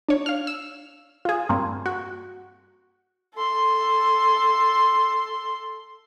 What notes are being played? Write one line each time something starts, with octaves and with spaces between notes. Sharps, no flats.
D4 C#5
F5 F6
E6
F4 G#4
G2 A#3 C4
F#4
A4 C6